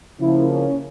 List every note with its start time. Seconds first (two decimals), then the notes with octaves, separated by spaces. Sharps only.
0.20 C#3 F3 A#3 E4
0.49 C#4